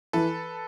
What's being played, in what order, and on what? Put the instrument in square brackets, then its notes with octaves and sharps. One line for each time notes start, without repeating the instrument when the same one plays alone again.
[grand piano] E3 [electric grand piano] A4 B4